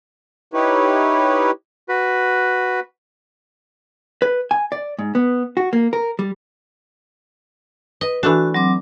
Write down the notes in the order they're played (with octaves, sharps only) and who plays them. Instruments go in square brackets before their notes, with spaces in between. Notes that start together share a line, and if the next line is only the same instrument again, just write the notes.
[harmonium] D#4 E4 G4 B4 C#5
[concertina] F#4 B4
[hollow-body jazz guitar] B4
G#5
D5
G#2
B3
F#4
A#3
A#4
G3
[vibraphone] B4 [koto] D#5
[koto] E3 A3 D4 [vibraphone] F#4
[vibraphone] F#3 C4 D6